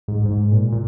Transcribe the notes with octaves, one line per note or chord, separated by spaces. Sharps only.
G#2
G#2
A#2
A#2